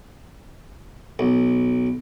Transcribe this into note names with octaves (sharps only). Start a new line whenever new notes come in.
B1